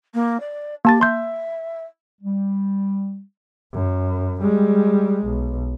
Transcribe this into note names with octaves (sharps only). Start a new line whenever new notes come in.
A#3
D5
A#3 G4 A5 A6
E5 C6 G6
G3
F#2
G3 G#3
B1